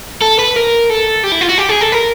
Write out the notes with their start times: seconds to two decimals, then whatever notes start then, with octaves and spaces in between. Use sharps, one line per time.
0.22 A4
0.39 B4
0.56 A#4
0.90 A4
1.24 G4
1.32 E4
1.41 F4
1.49 F#4
1.58 G4
1.69 G#4
1.81 A4
1.92 A#4